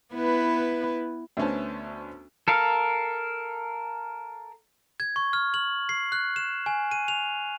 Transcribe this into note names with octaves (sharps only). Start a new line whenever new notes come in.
B3 E4 B4
D2 A3 B3 C#4 C5 A5
A4 A#4 F5
G#6
C#6
F6
F#7
C7
F#6
E7
G#5
D#7
F7